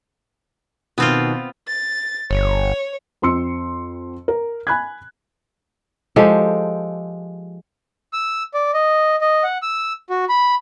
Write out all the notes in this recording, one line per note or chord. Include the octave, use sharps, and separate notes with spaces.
B2 D#3 B3 C4 F4
A6
G1 C#5
F2 C4 C6 E6 C#7
A#4
G#5 B5 F#6 G#6
F3 G#3 G4 A4
E6
D5
D#5
D#5
F#5
E6
F#4
B5